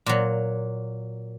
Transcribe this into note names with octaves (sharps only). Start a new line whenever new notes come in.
A#2 F#3